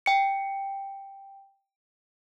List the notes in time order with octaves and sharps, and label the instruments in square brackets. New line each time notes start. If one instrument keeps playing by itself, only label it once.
[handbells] G5 C#7